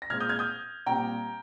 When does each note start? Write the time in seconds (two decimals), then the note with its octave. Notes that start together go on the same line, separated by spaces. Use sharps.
0.02 A#6
0.10 A#2 G#3 C4 F6 G#6
0.20 D#6 G6
0.29 F6 G#6
0.39 D#6 G6
0.86 A#2 G3 C4 G5 A#5